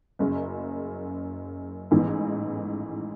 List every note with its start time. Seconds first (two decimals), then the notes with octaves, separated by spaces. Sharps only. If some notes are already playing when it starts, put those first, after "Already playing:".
0.19 F#1 F#2 C#3
1.91 A1 G#2 E3